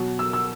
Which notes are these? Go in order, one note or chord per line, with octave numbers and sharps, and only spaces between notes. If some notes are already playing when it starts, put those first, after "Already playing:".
Already playing: B2 F#3
E6
E6